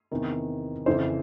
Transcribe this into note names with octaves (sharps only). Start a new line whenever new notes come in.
E2 C3 D#3
F2 C#3 E3 C5